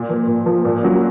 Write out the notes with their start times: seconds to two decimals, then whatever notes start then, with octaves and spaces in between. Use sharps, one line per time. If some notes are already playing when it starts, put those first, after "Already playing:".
Already playing: A#2
0.09 F3 A#3
0.27 A#2
0.46 F3 A#3
0.65 A#2
0.82 F#3 C#4